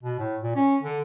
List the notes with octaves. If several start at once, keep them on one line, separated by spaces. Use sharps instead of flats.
B2
A2
A#2
C#4
D3